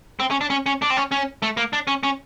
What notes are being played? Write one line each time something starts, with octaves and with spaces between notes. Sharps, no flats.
C4
C#4
D4
C#4
C#4
D4
C4
C#4
C#4
A3
A#3
D4
C#4
C#4